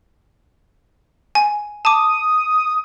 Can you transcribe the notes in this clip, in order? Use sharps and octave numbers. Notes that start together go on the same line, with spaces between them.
G#5
A5 D6 D#6